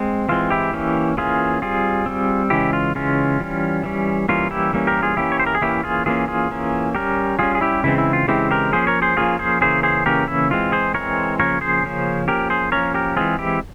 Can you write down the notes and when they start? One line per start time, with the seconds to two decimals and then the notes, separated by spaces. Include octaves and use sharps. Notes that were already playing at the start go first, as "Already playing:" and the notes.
Already playing: G#3 C4
0.29 E3 G#3 C4 F4
0.50 E4 G4
0.73 E3 A#3 C#4
1.17 E3 A#3 C#4 F4 G#4
1.62 G3 C4 F4 G#4
2.06 G3 C4
2.50 C#3 E3 G#3 C#4 E4 G4
2.73 F4
2.95 C#3 E3 G#3 C#4 F4
3.40 E3 G3 C#4
3.83 E3 G3 C#4
4.29 E3 G3 A#3 C#4 F4
4.51 E4 G4
4.73 E3 G3 A#3 C#4
4.87 G4 A#4
5.02 F4 G#4
5.17 E3 A#3 C#4 E4 G4
5.32 C#5
5.39 C5
5.46 A#4
5.55 G#4
5.61 E3 A#3 C#4 E4 G4
5.84 F4 G#4
6.06 E3 A#3 C#4 F4 G#4
6.28 F4 G#4
6.51 E3 A#3 C#4
6.95 G3 C#4 G4 A#4
7.39 G3 C#4 F4 G#4
7.55 G#4
7.61 E4 G4
7.84 C#3 E3 G#3 C4 E4
7.98 E4
8.13 F4
8.28 C#3 E3 G#3 C4 E4 G4
8.51 G4 A#4
8.72 F3 A#3 C#4 G#4 C5
8.87 A#4 C#5
9.02 G#4 C5
9.17 F3 A#3 C#4 F4 G#4
9.39 G#4 C5
9.61 C#3 E3 A#3 C#4 G#4 C5
9.83 G#4 C5
10.06 C#3 E3 A#3 C#4 G4 A#4
10.28 E4
10.50 E3 G#3 C4 F4
10.72 G#4 C5
10.94 E3 G#3 C4 A#4 C#5
11.39 C#3 F3 A#3 C#4 A#4 C#5
11.61 G#4 C5
11.83 C#3 F3 A#3 C#4
12.28 F3 A#3 C#4 G4 A#4
12.50 G#4 C5
12.72 F3 A#3 C#4 A#4 C#5
12.94 G4 A#4
13.16 E3 G#3 C4 F4 G#4
13.39 E4 G4